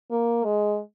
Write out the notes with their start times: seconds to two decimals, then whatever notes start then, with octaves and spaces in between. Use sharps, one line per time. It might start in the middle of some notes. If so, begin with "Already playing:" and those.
0.11 A#3
0.44 G#3